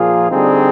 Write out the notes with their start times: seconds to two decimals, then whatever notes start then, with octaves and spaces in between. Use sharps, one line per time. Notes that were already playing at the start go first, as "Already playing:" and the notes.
Already playing: A#2 F3 A#3 F4 G#4
0.30 D3 G3 C4 D#4 G#4